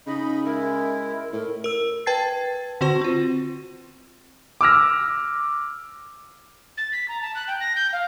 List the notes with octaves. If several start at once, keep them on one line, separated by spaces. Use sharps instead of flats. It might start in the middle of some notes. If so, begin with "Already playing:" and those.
C#3 D#4 D#5 B5
G#3 E4 A#4
A2 A#4
A#4 E6
B4 G5 A5 G#6 A6 C7
D3 C4 F#4 C5 C#6
C4 F4
D6 E6 F6 A#6
A6
B6
A#5
A5
F#6
G5
A#6
G6
F5